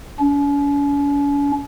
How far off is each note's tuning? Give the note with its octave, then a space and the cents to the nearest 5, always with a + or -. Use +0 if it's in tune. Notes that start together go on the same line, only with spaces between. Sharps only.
C#4 +45